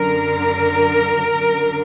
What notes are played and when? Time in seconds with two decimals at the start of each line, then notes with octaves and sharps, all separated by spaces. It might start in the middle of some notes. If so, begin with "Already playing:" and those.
Already playing: F#2 D3 A#4
1.34 F#2 D3